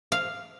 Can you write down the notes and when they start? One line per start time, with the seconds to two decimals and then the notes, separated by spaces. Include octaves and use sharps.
0.12 F5